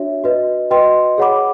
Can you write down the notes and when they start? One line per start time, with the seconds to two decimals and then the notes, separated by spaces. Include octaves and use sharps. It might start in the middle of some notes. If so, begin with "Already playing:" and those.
Already playing: D4 F#4 C#5 E5
0.24 F#4 B4 D#5
0.71 F#4 B4 D#5 G5 C6
1.18 G#4 C#5 F#5 B5 D6